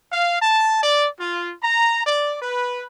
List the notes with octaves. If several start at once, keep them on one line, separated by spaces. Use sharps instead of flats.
F5
A5
D5
F4
A#5
D5
B4